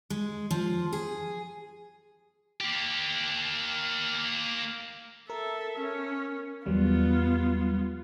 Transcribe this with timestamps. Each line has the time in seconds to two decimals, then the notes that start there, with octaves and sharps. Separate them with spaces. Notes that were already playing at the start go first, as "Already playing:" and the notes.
0.10 G#3
0.51 F3
0.93 G#4
2.61 A#3 G4
5.30 A4 A#4 E5
5.80 C#4
6.66 E2 F#3 G3 B3 F4